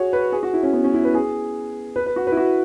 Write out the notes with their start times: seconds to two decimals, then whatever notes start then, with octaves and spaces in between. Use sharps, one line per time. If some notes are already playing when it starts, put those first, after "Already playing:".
Already playing: F#4 G#4 C#5
0.13 B4
0.32 G#4
0.43 F#4
0.53 E4
0.63 C#4
0.73 B3
0.84 C#4
0.94 E4
1.05 B4
1.14 G#4
1.96 B4
2.06 B4
2.16 F#4
2.27 B4
2.32 E4
2.37 F#4